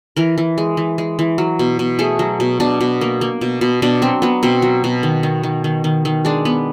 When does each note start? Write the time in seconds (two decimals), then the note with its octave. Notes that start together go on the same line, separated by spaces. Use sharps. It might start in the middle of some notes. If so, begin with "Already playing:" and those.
0.16 E3 A#4
0.38 E3
0.58 G#3
0.77 E3
0.98 G#3
1.19 E3
1.38 F#3
1.59 B2
1.79 B2
1.99 A3 G#4
2.19 F#3
2.40 B2
2.60 B2 D4
2.81 B2
3.01 A#3
3.21 A#3
3.41 B2
3.61 B2
3.82 B2 D4
4.02 F#3 C4
4.22 F#3 B3
4.43 B2 C4
4.62 F#3
4.84 B2
5.03 D#3
5.23 D#3
5.43 D#3
5.64 D#3
5.84 D#3
6.05 D#3
6.25 G#3 D4
6.45 B3